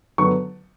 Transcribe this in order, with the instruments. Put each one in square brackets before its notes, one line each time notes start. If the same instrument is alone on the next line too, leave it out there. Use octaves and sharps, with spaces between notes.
[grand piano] D3 F#3 B3 C#6